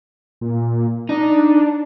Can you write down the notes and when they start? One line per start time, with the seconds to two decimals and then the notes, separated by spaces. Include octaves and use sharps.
0.41 A#2
1.09 D4 D#4